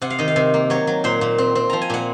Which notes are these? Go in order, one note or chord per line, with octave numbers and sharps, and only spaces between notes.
C3 F#5
F5
D#3 D#5
F5
C3
A#3
F#3 C#5
F#3
A#2 C5
A#2
C4
C4
F3 A#5
G#5
A#2 F#5